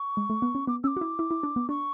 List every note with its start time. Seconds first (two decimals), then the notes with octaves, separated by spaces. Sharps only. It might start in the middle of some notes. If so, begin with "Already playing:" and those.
Already playing: C#6
0.17 G#3
0.30 A3
0.42 B3
0.55 C#4
0.67 B3 D6
0.83 C#4 D6 E6
0.97 F#4
1.01 E4
1.19 E4
1.31 E4
1.43 D4
1.56 B3
1.69 D4 C#6